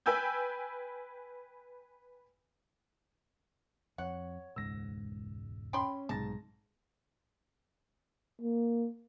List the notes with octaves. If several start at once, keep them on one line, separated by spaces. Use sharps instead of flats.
B4 G5 G#5 E6 G6
F2 C#5 F#5
E1 C#2 G#2 E6 A#6
C#4 G5 B5 C6
B1 G#2 C3 A5 A#6
A#3